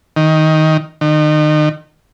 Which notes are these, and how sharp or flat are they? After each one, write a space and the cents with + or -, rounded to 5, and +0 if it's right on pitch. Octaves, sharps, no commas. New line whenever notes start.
D#3 +10
D#3 -35